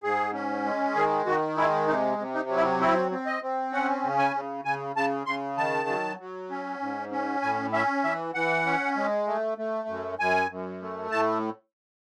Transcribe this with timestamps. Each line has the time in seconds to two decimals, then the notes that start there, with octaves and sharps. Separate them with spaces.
0.03 G#2 G#4
0.33 C#4
0.65 G#3
0.96 D#3 G#4
1.26 D#3 F#4
1.57 G#3 E4
1.88 C3 D#4
2.18 C3
2.34 D#4
2.49 F#3
2.57 E4
2.80 C4 E4
3.11 C4
3.26 D#5
3.42 C4
3.72 C#4 F#5
4.04 C#3
4.18 G#5
4.35 C#3
4.65 C#3 G#5
4.96 C#3 A5
5.26 C#3 C6
5.57 D#3 A5
5.89 F#3
6.19 F#3
6.50 C#4
6.81 G#2
7.11 C#4
7.42 A2 G#5
7.73 C#4 E5
8.04 E3 E5
8.34 E3 F#5
8.66 C#4
8.96 G#3
9.27 A3
9.58 A3
9.88 F#2
10.19 F#2 G#5
10.50 F#2
10.82 A3
11.11 A2 A5